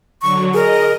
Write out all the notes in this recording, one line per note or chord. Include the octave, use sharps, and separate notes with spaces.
D3 F#3 C#6
G#4 A#4 D#5